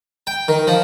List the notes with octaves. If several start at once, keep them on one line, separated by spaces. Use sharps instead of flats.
G5
D#3
F3